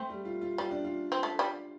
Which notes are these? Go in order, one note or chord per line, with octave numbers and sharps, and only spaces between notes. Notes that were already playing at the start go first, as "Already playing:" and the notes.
Already playing: A3 C4
G3
F4
F4
G3 F4
D4
F4
C4
A3
G3